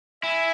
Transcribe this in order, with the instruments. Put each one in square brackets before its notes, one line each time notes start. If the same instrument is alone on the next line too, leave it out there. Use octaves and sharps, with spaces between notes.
[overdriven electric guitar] E4 [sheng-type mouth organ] E5 G#5